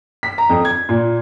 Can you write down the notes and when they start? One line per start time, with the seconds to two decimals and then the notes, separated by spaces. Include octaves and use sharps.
0.23 B6
0.38 A#5
0.49 F2
0.65 G#6
0.89 A#2